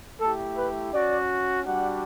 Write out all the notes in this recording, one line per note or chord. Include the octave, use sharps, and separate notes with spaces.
A3 E4 G4 A4
B4
C#4 F#4 D5
G3 D4 F#4 F#5